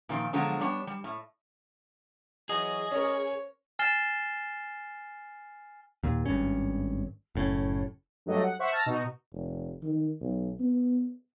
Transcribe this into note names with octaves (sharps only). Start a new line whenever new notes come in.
A#2 D#3 F3
B2 D3 F3 F#3 G#3
G3 B3 D4 C#5
G3
A2
E3 F#3 G#4 D#5
C#4 A#4 C5 C#5
G#5 F6 A6 C7 E7 G7
D#2 A#2
G#1 G2 C#4
F#1 A2 C#4
G2 F#3 A3 D#5
F#5
C5 E5 F#5 C#6
A5 E6 F6 A6 A#6
B2 D#4 F#4
F1
D#3
B1
B3